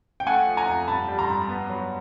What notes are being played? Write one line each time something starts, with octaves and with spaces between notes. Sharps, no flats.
G5
A3 F#5 G#5
F3
G#5 A#5
F2
G2 A5 B5
G3
A#5 C6
G2
B3
F#3